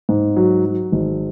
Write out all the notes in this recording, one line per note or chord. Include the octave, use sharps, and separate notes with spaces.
G#2
F#3
F#3
G#1